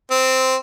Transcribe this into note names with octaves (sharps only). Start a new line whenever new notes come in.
C4